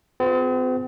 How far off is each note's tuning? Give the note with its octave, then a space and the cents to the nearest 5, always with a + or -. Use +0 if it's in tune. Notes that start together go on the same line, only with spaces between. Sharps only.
C4 -45 F4 +25 G#4 +0